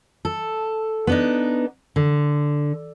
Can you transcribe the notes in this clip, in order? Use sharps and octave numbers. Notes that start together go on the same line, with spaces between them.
A4
B3 D4 D#4
D3